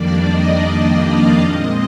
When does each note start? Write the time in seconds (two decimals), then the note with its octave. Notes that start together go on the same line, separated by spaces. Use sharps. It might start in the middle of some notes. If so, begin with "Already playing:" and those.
Already playing: F2 D#3 G3 A#3 D4 D5
0.27 D#5
1.02 F5
1.41 A#2 G#3 C4 D#5